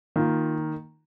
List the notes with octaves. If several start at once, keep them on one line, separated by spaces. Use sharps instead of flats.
D#3 A#3 F4